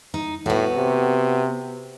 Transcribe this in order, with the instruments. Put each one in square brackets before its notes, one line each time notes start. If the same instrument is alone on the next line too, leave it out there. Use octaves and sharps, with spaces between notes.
[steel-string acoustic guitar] D#4
[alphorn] A2 [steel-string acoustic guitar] B3 F#4
[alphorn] C3